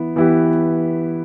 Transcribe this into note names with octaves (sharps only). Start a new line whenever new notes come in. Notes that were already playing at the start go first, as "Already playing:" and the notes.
Already playing: E3 B3 E4
E3 B3 E4 G4